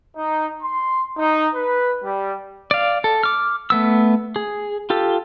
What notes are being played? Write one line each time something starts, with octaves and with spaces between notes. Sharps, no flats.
D#4
C6
D#4
B4
G3
D5 F5
A4
D6 F6
A3 B3 E6
G#4
F4 G4 A4